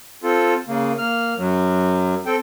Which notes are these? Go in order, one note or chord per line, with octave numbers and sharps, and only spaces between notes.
C4 F4 A4
C#3 A#3
A#3 F6
F#2 F#3
C4 A4 G5